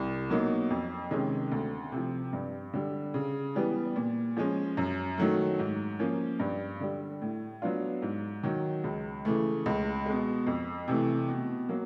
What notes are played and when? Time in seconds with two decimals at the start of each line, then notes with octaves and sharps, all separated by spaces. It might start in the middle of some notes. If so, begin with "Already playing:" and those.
Already playing: C2
0.29 B2 F#3 A#3 D#4
0.70 F2
1.11 C3 D#3 G#3 C#4
1.52 D2
1.92 C3
1.97 F3
2.33 G2
2.74 D3 G3
3.14 C#3
3.55 E3 G3 B3
3.96 A#2
4.37 F3 G#3 C#4
4.77 F#2
5.18 D#3 F#3 A3
5.59 G#2
5.99 F3 A#3 C#4
6.40 G2
6.80 D3 G3
7.22 A2
7.62 F#3 B3 D4 F4
8.02 G#2
8.43 D#3 F#3
8.84 C#2
9.25 C#3 E3 A3
9.66 C#2
10.06 B2 G#3
10.46 F2
10.88 C3 E3 A3
11.28 B2
11.69 F#3 A#3